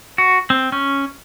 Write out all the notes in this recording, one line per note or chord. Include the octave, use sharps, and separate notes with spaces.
F#4
C4
C#4